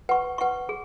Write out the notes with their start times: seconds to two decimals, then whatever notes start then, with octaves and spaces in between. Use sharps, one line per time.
0.09 B4 F#5 C#6
0.38 B4 F#5 C#6
0.69 G#4